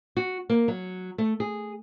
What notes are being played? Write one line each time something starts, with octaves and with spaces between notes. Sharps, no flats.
F#4
A#3
F#3
A3
G#4